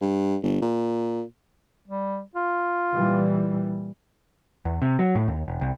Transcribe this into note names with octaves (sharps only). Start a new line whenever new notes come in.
G2
G1
A#2
G3
F4
A#2 E3 G3
E2
C3
F#3
A2
D#2
E1
C2